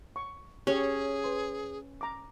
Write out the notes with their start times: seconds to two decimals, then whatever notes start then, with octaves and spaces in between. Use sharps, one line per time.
0.16 C#6
0.67 C#4 G4 G#4 C#5
1.24 B4 C6
2.01 A#5 D6